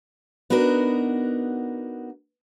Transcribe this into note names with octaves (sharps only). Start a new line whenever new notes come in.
B3 D4 D#4 F#4 A#4